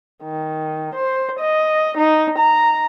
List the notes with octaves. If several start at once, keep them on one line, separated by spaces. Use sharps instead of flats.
D#3
C5
D#5
D#4
A#5